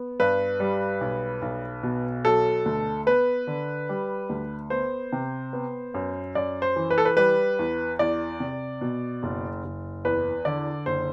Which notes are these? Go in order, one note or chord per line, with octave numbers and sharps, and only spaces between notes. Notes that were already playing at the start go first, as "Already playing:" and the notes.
Already playing: B3
G2 B4
G3
B1
B1
B2
F#3 A4
D2
B3 B4
D3
G3
D2
B3 C5
C3
B3
F#2
F#2 D5
C5
E3
B4
A4
B4
G3 B4
E2
E2 D5
C3
B2
F#1
F#1
E2 B4
D3 D5
F#1 C5